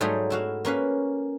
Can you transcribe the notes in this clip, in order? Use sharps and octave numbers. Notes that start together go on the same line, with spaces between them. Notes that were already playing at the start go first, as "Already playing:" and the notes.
G#2 F#3 G3 A3 D#4 G#4
E4 F#4 F5
A#3 C#4 B4 F5